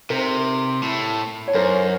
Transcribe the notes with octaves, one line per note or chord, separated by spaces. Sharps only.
C3 A#4 C5
A2
C#5
F#2 A#4 C5